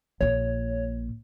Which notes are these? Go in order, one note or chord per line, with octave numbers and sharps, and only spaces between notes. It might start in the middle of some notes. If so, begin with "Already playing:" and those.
A#1 A#2 C#5